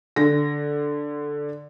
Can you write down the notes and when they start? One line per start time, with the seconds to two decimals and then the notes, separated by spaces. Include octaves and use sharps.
0.16 D3 A#6